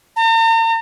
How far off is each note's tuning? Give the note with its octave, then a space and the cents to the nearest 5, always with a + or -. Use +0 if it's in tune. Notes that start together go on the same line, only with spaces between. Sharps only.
A#5 -45